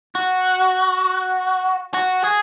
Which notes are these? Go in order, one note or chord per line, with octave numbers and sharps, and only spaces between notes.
F#4
F#4
G#4